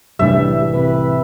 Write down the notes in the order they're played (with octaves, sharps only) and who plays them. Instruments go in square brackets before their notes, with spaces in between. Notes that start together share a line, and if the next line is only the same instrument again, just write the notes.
[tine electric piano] C2 A2 E3 [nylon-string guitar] G3 A3 D4 [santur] E5
[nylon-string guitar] C3 [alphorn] B4